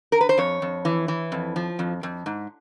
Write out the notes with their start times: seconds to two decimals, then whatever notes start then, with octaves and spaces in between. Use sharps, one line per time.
0.12 A#4
0.21 B4
0.29 C5
0.38 F2 C#5
0.62 F2
0.85 E3
1.08 E3
1.32 F2
1.56 F3
1.79 F2
2.03 F2
2.26 G#2